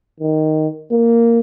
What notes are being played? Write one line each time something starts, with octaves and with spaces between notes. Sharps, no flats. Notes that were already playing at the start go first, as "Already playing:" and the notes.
D#3
A#3